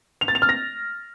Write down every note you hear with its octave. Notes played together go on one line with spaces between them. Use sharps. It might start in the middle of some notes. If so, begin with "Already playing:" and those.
F7
A6
F7
F6
A#6